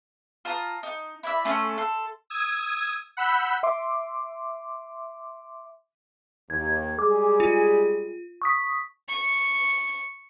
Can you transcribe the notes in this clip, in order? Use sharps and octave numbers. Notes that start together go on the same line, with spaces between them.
F4 A5 A#5 D#6
D#4
E4 D5 E5
A3 C#4 A4 C6
A4 C6
D#6 E6 G#6 D#7
F#5 B5 E6 G6
E5 C6 D6
D#2 G#6
G3 G#3 G#4 D6
F4
C#6 D#6 B6
C#6